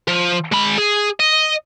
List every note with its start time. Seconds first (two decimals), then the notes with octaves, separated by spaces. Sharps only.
0.08 F3
0.52 G#3 B5
0.78 G#4
1.20 D#5